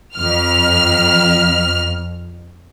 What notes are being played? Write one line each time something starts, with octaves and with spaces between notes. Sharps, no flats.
F2 F6